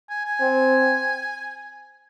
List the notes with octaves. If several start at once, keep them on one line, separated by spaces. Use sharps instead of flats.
G#5
G#5
C4